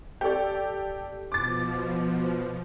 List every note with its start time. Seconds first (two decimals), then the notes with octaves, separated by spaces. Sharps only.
0.21 G4 A4 D5
1.32 B2 F3 D6 A6